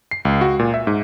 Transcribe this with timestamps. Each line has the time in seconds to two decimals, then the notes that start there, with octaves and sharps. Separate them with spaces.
0.11 C7
0.25 C#2
0.41 F#4
0.59 A#2
0.74 E5
0.87 G#2